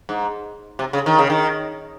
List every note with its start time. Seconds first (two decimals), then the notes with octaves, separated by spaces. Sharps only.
0.09 G#2
0.79 C3
0.93 C#3
1.06 D#3
1.19 C#3
1.30 D#3